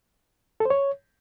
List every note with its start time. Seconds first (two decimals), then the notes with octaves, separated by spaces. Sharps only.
0.60 A4
0.65 C5
0.70 C#5